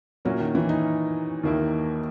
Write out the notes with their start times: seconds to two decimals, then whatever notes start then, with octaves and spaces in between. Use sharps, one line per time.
0.25 A#2 F#3 A#3 C#4 E4
0.40 D#3
0.55 E3
0.69 D#4
1.43 D#2 D#3 A#3 E4